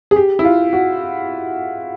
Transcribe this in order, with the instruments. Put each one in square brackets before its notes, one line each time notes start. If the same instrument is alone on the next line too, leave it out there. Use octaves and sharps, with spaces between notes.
[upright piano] G#4
G4
E4
F4
F#4